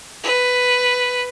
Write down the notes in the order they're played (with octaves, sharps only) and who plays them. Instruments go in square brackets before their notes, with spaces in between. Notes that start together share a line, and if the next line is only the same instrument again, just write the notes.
[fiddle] B4